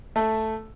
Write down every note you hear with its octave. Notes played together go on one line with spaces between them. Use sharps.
A3